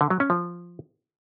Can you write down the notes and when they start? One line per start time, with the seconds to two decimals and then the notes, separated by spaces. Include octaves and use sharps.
0.01 D3
0.10 F#3
0.20 C#4
0.30 F3